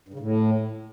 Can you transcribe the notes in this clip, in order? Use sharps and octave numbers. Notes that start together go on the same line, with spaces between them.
G2
C#3
A2